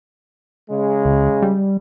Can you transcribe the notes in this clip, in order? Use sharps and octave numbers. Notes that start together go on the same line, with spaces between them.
C#3 G#3
C#2
G3